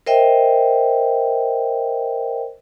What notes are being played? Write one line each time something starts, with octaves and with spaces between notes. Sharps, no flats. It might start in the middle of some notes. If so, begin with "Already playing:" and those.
A#4 C5 D#5 E5 G5